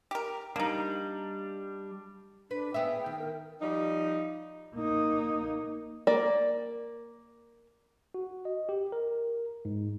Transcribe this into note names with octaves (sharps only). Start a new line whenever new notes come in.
G4 A#4
G3 A#3 D4 D#4
D4 B4
B3 G#4 E5 G5
D#3
A#4
F3 G3 D#4
A#3 D#4
A#3 D5
F#4
D#5
G4
A#4
G#2